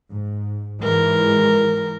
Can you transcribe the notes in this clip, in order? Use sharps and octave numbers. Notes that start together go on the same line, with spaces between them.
G#2
G#2 E3 G#3 A#4